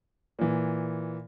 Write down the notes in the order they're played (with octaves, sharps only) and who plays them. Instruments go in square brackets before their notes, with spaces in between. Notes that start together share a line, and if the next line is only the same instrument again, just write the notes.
[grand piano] A#2 E3